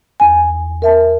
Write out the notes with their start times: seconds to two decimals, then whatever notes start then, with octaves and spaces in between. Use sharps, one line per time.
0.20 E2 G#5
0.82 A#4 E5 A5